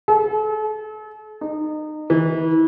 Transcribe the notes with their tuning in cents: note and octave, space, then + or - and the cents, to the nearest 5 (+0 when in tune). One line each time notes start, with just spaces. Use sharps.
A4 -40
D#4 -25
E3 -30